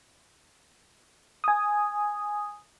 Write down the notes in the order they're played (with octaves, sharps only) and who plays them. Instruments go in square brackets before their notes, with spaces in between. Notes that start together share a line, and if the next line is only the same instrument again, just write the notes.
[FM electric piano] G#5 D#6